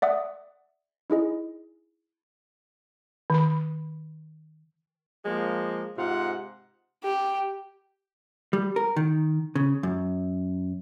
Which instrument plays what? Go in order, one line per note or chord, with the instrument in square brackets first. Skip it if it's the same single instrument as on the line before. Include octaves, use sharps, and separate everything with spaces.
[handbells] D5 E5 F#5 D#6
D#4 E4 G#4 D#5
[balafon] D#3 B5
[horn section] F3 G#3 A#3
G#2 C3 F4 F#5
[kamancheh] G4
[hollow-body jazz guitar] G3
A#4
D#3
C#3
F#2